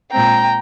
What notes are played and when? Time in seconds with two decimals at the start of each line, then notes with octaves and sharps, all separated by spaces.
0.12 A#2 G#3 C4 G5 A#5